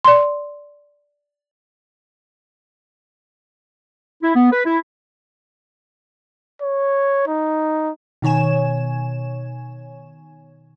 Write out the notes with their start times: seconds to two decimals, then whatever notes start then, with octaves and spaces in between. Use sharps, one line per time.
0.05 D5 C6
4.22 E4
4.34 B3
4.51 B4
4.65 E4
6.62 C#5
7.27 D#4
8.22 B2 D#3 C#5 G#5 E7